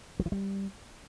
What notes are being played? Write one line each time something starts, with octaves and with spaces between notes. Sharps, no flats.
F#3
E3
G3